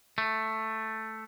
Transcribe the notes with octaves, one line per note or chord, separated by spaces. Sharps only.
A3